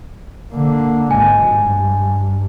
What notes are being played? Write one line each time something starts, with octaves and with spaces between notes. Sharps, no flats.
D3 A#3
G#1 G#3 G#5
G2